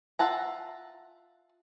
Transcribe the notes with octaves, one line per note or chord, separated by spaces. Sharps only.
F4 E5 F#5 A5 A#5